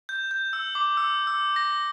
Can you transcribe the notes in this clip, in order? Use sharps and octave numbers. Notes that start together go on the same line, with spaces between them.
G6
G6
E6
D6
E6
E6
A#6